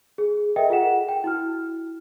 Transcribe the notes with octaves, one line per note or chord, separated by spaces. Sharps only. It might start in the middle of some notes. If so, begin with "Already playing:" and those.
G#4
A4 A#4 D#5 E5 G5
F4 G#4 F#5 E7
G5
E4 F#4 F6